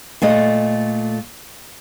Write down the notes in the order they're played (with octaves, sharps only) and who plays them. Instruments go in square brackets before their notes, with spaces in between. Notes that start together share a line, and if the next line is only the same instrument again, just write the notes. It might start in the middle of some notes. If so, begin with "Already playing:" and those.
[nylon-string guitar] A#2 A3 D#5